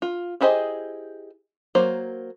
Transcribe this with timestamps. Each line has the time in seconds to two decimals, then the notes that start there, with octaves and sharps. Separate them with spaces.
0.02 F4
0.41 E4 G4 G#4 C5 D#5
1.75 F#3 A#3 C5